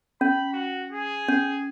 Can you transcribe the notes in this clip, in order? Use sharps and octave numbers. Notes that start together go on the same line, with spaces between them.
C#4 B5
F#4
G#4
C#4